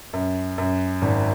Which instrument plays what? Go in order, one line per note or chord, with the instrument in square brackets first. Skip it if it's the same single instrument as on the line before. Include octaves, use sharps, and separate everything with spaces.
[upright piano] F#2
F#2
G#1